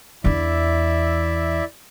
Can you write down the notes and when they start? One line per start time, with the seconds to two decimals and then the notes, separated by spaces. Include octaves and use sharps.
0.24 E2 D4 E4 D5 E5